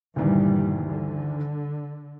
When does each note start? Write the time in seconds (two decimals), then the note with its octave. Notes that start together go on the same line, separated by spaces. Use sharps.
0.16 D2 G2 A#2 D#3 E3 G3
0.91 D3